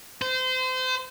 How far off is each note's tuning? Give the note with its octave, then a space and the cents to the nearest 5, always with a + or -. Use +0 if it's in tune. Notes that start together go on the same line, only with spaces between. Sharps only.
C5 -30